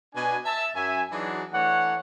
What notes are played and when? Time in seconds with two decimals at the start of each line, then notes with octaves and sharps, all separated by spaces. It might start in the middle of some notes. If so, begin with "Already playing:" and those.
0.14 B2 D4 G#5
0.46 E5 A5
0.75 F#2 E5 G#5
1.12 E3 F#3 D4 D#4 F#4 G#4
1.53 E3 A3 D4 C#5 F#5